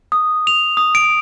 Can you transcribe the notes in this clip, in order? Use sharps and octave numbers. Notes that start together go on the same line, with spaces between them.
D#6
F7
D#6
D7